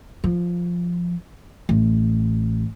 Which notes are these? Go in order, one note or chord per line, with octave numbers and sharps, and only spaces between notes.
F3
A1